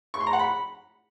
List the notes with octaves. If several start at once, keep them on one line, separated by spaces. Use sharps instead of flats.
C#6
C6
A#5
F#5
B5